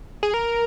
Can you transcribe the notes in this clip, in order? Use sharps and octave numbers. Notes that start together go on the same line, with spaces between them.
G#4
A#4